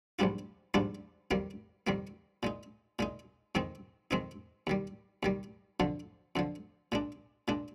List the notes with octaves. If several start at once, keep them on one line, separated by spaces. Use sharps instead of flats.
A#1 G#2 G3 D4 F4
A#1 G#2 G3 D4 F4
F2 D#3 G3 A#3
F2 D#3 G3 A#3
A#2 G#3 D#4
A#2 G#3 D#4
F2 D#3 G#3 C4 D#4
F2 D#3 G#3 C4 D#4
D#2 D#3 G3
D#2 D#3 G3
F2 D3 F3
F2 D3 F3
A#2 G#3 D4
A#2 G#3 D4